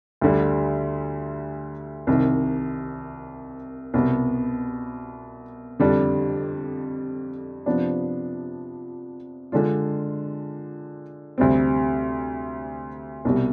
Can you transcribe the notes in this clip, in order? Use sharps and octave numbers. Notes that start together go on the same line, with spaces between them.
D2 D3 G3
C2 C3 D#3
C2 B2 B3
F2 D3 G3 D4
C3 F3 B3 D4
D3 G#3 D4 F4
D2 C3 G3 C4
C2 B2 G3